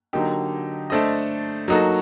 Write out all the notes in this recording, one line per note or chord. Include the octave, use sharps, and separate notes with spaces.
D3 F#3 A#3 D#4 G4
A3 D4 A4 C5 D#5
F#3 A#3 D#4 F#4 A4